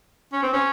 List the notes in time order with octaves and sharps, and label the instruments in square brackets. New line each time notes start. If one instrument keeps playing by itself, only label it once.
[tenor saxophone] C#4
C4
C#4